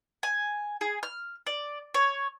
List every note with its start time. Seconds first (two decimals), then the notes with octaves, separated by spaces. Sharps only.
0.23 G#5
0.81 G#4
1.03 F6
1.47 D5
1.94 C#5